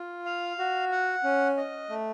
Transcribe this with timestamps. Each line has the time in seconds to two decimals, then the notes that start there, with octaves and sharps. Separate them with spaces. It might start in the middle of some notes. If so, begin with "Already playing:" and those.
Already playing: F4
0.26 F5
0.59 F#4
0.92 F#5
1.24 C#4
1.57 D#5
1.89 A3